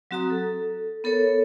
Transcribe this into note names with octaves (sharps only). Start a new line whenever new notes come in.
F#3 C4 F#4 A#5 D#6
A4
B3 A4 A#4 C#5